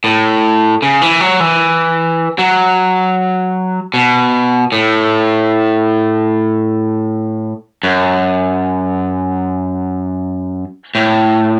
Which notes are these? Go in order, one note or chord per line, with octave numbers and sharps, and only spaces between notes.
A2
C#3
E3
F#3
E3
F#3
B2
A2
F#2
A2